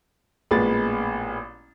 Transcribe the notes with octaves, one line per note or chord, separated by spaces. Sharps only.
A1 A#2 G#3 B3 B5 A6